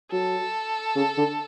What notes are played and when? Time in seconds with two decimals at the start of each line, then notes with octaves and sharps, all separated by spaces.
0.12 F#3 A4
0.96 C#3
1.17 D3